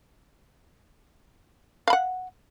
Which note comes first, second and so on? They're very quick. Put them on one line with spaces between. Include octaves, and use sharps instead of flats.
F5 B5 F#5